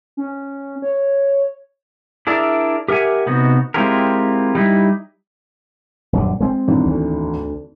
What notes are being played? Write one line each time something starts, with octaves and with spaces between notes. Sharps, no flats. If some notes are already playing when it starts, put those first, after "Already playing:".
C#4
C#5
D4 E4 G#4 A#4 D5 E5
G4 A#4 E5 F#5 G#5
C3 B3 D#4 F#4
G#3 C4 E4 F4 G4 A#4
G3 D#4 E4
D#1 F#2 D3
G#3 C4
G#1 E2 D3
D2